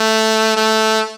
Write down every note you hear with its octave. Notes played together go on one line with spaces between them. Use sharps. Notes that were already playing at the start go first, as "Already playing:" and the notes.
Already playing: A3
A3